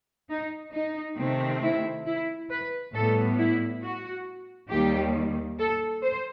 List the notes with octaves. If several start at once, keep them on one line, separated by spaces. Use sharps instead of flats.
D#4
D#4
C3 D#3 A3 C4
E4
E4
B4
A2 G3 B3 A4
E4
F#4
D#2 D#3 G3 G4
A4
C5